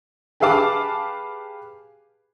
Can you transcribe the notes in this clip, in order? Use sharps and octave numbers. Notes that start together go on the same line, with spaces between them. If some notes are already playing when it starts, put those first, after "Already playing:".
G4 G#4 B4 F5 A5 D6